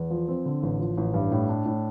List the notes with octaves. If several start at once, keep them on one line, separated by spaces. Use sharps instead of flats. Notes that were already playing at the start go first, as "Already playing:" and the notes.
Already playing: E2
F3
C4
D3
A1
F3
A1
G2
A2
D4
A2